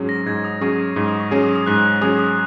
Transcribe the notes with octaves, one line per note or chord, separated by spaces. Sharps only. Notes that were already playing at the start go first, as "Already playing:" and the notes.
Already playing: G#2 F#3 C#4 G#4
A#6
G#2 G#6
D#6
F#3 C#4 G#4 C#6
C#6
G#2 D#6
D#6
C#6
F#3 C#4 G#4
D#6
D#6
G#2 F#6
F#3 C#4 G#4 D#6
D#6